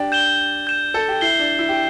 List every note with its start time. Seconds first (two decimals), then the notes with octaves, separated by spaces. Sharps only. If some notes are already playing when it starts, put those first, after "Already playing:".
Already playing: D4 G4
0.12 G6 E7 G7
0.67 G6 E7 G7
0.94 A4
1.08 G4
1.21 E4 G6 C7 G7
1.39 D4
1.59 E4
1.69 G4